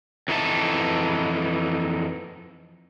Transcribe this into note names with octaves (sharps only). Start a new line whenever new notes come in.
F2 E3 D#4 E4 E5 A5